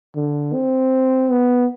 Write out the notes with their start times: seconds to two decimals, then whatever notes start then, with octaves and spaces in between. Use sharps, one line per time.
0.16 D3
0.53 C4
1.31 B3